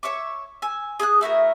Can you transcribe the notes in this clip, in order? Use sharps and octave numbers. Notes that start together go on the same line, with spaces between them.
C#5 E5 C#6 D6
G#5 E6
G#4 D#6 E6 F#6
A3 E4 F#4 A#4